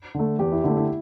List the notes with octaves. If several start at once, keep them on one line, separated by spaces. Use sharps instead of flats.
D3 A3
E2 G4
E4
D3 A3 E4
E4